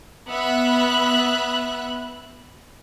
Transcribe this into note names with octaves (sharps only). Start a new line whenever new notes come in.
B3 E5 B5 F#6